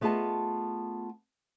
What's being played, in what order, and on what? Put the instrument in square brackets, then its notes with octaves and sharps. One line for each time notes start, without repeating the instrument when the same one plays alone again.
[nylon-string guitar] A3 B3 F4 G#4 D#5 A5